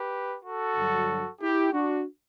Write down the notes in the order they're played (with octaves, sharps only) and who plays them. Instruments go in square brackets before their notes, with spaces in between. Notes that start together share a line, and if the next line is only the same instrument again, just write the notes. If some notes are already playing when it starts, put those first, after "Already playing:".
Already playing: [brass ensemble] G4 B4
F#4 A4
G2 D3 F#3
E4 G4
D4 F#4